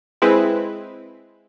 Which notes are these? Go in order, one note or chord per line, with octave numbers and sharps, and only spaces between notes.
G#3 C4 E4 B4